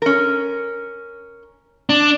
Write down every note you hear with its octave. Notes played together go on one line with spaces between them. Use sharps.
C#4 A#4
D4